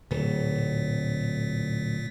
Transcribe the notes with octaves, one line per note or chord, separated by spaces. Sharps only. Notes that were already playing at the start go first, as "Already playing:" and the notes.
D1 A#2